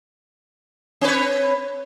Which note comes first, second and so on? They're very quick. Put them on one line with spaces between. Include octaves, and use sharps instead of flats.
C4 B4 C#5